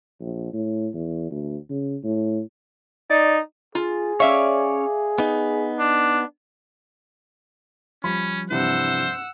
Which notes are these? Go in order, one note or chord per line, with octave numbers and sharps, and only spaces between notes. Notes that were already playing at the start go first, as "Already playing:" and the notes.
A#1
A2
E2
D2
C#3
A2
D#4 D5
F4 G#4
C#4 C#5 D5 E5 F5
B3 D#4
D4
F3 G3 C#4 B5
G2 C3 E3 C5 F#5 E6